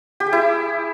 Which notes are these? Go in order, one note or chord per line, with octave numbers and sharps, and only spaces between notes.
G4
G#4
E4